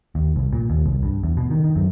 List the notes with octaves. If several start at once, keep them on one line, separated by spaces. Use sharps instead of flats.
D#2
C2
A#2
D#2
C2
G2
E2
B2
D#3
D#3
F#2